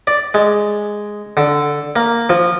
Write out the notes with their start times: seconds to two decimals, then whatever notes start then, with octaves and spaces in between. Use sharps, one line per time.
0.07 D5
0.34 G#3
1.37 D3
1.96 A#3
2.30 F3